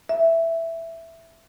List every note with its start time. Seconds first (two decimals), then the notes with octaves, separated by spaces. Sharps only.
0.09 E5